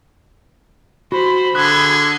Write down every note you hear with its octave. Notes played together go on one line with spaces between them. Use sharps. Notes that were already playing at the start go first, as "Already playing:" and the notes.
F#4 C5 B5
D3 G#4 D#6 F#6 G#6